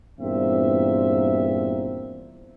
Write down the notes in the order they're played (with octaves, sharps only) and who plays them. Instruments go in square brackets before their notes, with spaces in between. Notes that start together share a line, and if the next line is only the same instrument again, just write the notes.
[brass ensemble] E2 G2 A#2 A#3 C4 E5